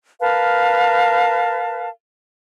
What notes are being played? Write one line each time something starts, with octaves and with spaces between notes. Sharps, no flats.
A#4 B4 F5 A5